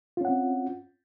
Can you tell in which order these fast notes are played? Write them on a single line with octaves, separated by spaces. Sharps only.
F4 C#4 F#5 C4